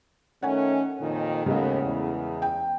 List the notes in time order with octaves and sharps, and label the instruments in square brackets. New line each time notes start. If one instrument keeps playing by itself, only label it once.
[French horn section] D#3 A3 C#4 [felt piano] F#5 G#5
[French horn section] F2 A#2 D#3
[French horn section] D#2 B3 [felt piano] C#3 G#3 A3
[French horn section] E2
[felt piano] G5